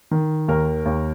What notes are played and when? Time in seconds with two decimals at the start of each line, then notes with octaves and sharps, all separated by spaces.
0.11 D#3
0.48 D#2 A#4
0.85 D#2